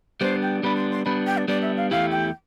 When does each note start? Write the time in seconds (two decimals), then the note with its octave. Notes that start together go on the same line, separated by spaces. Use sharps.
0.21 G3 B3 D4 C5
0.42 G5
0.63 G3 B3 D4 B5
0.77 C6
0.91 C6
1.05 G3 B3 D4 B5
1.27 G5
1.37 D5
1.48 G3 B3 D4 D5
1.62 E5
1.77 F5
1.91 E2 B2 A3 E4 G4 F5
2.11 G5